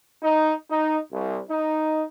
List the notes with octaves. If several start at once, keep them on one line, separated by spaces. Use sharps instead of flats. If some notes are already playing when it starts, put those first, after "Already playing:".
D#4
D#4
C2
D#4